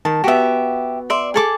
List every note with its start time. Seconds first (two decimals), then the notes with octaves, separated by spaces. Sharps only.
0.05 D#3 A5
0.24 B3 F#4 G4 E5
1.10 D5 E5 C6
1.34 G#4 A4 D6